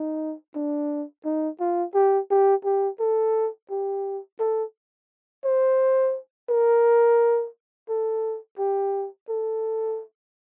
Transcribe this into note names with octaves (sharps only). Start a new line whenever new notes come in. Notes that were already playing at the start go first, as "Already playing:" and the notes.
Already playing: D#4
D4
D#4
F4
G4
G4
G4
A4
G4
A4
C5
A#4
A4
G4
A4